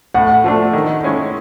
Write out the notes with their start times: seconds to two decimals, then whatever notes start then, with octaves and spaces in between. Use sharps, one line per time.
0.14 A2 F#5
0.44 F3 A3 D4
0.73 D#3
1.03 G#3 C#4 E4